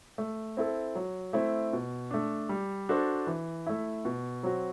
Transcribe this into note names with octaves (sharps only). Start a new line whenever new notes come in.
A3
C4 E4 A4
F#3
A3 C4 E4
B2
A3 D4
G3
D4 F#4 A4 C5
E3
A3 E4
B2
F#3 C4 F#4